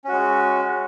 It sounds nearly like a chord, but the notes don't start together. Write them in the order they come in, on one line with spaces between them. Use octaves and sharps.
C#4 F#4 G#3